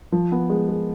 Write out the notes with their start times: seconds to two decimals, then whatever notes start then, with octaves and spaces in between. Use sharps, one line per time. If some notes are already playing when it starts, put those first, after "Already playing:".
0.12 F3
0.32 B3
0.50 G#3
0.69 G#3